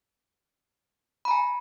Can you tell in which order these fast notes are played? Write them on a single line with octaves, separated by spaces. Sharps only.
B5 A#5 G#5